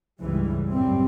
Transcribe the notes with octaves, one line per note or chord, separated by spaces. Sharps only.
C#2 G2 E3 G3
C2 F#2 A2 G3 C4